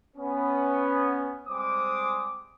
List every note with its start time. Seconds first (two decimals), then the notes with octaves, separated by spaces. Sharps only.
0.16 B3 C#4
1.48 G3 G#3 C4 C5 D6 D#6